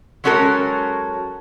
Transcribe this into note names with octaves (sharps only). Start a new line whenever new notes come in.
F#3 G#3 C#4 F#4 A4 A#4